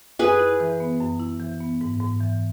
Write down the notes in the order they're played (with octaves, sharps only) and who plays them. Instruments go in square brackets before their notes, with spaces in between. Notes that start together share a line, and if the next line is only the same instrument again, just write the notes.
[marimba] F#2 [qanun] G#4 B4
[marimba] E4
E3
B3
F#2
E4
E3
B3
G#2
G#2
E3